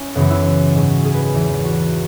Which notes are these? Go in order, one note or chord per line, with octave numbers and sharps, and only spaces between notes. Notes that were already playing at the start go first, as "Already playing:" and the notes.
Already playing: C#4 E4
F#2 C#3 E3 B3
E4
E4
G#2 F#3
G#4
B4
B4
E2 E3
F#4